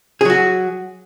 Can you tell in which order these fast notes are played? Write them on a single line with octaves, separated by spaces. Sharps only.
G#4 F#3 F#4